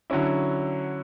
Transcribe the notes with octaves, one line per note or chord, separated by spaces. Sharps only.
D3 F#3 C#4 E4